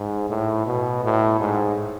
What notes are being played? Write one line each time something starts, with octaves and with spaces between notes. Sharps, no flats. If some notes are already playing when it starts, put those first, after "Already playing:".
Already playing: G#2
A2
B2
A2
G#2